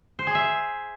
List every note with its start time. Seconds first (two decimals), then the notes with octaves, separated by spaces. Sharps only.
0.19 C5
0.27 G#4
0.35 E5